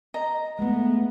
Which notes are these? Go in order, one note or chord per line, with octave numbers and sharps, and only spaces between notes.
D#5 A#5
G#3 A3 B3